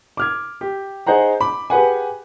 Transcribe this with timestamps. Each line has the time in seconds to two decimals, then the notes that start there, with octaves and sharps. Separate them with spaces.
0.17 D6 F6 G#6
0.61 G4
1.07 D#4 G#4 C5 F#5 A#5
1.41 B5 D6
1.70 G4 G#4 B4 F#5 G#5